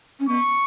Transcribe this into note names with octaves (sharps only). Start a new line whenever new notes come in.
C#4
B3 C#6